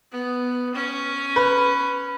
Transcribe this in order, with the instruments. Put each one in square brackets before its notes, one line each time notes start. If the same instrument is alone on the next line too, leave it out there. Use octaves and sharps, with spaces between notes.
[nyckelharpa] B3
C#4
[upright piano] B4